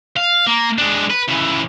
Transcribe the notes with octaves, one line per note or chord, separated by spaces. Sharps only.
F5
A#3
G#3 D4
B4
C#3 E3